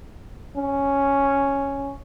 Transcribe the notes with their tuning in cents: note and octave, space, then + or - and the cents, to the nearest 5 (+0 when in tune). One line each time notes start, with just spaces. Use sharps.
C#4 +0